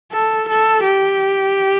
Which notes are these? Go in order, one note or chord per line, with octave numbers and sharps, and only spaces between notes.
A4
A4
G4